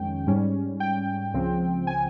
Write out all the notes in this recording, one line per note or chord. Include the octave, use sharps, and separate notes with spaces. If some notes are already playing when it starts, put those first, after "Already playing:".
Already playing: F2 D#3 G#3 C#4 G5
G#2 G3 C#4
G5
C#2 C#3 F3 C4
G#5